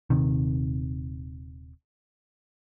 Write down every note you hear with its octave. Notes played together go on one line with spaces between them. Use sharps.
D#1 C3 D#3